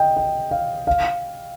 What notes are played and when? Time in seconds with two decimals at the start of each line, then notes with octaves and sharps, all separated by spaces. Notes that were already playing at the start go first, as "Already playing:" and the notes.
Already playing: D#5 G5
0.17 G5
0.51 F5
0.87 F5